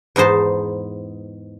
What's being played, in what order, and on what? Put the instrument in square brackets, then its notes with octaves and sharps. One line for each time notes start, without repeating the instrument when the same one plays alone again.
[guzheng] E2 G#2 D#4 C5 A5